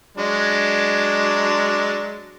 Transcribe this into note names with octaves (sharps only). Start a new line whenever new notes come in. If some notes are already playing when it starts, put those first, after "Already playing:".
F#3 G#3 D4